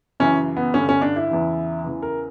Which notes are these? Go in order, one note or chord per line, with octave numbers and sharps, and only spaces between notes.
F#2 C#3 E3 C#4
B3
G2 D3 C#4
C#4
D4
E4
E2 C#3 E3
E2 C#3 E3
A#4